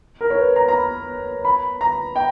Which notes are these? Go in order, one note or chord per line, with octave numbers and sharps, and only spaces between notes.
A#4
C#5
B4
A#5
A#5
B5
B5
A#5
G5